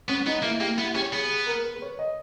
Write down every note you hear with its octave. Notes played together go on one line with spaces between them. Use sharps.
B3 C#4
B3 D#4
A#3 E4
A#3 G4
B3 E4
C#4 G4
B3 G#4
G#4
A#4
B4
B4
C#5
D#5